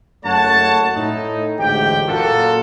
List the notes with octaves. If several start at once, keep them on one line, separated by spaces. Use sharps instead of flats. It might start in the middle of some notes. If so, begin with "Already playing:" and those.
F#1 F#2 A3 C#5 F#5 A5
A2 D#4
A1 D2 G#2 G4 G5
F#1 A#2 A#3 F4 F#4 A4